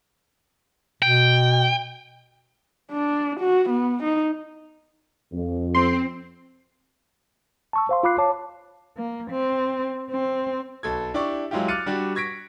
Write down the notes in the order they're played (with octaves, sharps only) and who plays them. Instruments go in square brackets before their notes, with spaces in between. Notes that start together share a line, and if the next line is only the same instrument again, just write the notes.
[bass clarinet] B2 [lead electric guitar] G5
[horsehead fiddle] D4
F#4
B3
D#4
[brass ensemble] F2
[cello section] C4 [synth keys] C6
[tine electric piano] A5 C#6 E6
C5 F5 C6
F4 F5 B5 D6 F#6 C7
C#5 A5 D6
[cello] A#3
C4
C4
[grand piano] B1 A4 G#6
D4 E4 G4 D5 C#6
F#3 G#3 E4 F4 G4
D6 F6 F#6 A6 C#7 D#7
G3 D4 F#4 G4
C#6 G#6 A#6 B6 D7